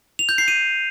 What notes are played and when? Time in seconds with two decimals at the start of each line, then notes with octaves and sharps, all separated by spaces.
0.19 F7
0.29 G6
0.38 C7
0.48 D#7